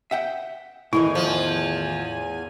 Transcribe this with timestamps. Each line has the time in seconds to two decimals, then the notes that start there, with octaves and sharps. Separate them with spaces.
0.11 E5 F#5 G5
0.93 E2 A2 D#3 E3 E4 G#5
1.15 F3